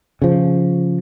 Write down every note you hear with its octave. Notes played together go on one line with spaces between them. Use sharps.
C#3 F3